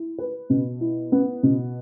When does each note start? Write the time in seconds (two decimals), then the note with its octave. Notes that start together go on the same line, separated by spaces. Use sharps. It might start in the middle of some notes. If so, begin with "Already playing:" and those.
Already playing: E4
0.18 B4
0.50 B2
0.81 E4
1.12 B3
1.43 B2